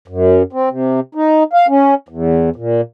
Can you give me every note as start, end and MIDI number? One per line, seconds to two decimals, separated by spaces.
0.08 0.43 42
0.53 0.69 60
0.70 1.00 48
1.15 1.43 63
1.53 1.67 77
1.68 1.94 61
2.09 2.50 40
2.56 2.81 46